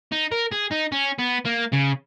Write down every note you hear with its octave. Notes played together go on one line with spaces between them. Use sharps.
D#4
A#4
G#4
D#4
C#4
B3
A#3
C#3